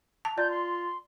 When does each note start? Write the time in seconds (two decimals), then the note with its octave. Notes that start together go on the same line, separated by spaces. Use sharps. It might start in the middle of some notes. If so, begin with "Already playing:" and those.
0.25 A5
0.38 F4 D5 G6
0.51 C6